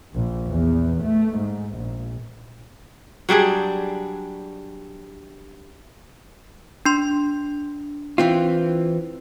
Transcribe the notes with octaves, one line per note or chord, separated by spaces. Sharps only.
A#1
E2
A3
G#2
A#1
F#3 G3 D4 G#4
D4 C6
E3 C4 F4